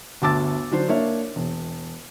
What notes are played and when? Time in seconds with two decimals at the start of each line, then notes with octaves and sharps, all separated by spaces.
0.22 G1 D2 A5 D6 E6 A6
0.71 D3 F#3 D4 C5
0.88 A#3 D4 C#5 E5
1.36 E1